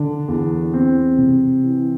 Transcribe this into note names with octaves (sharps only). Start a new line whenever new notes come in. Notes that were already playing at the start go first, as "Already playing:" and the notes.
Already playing: D3 D4
E2
E2 C4
C3
E3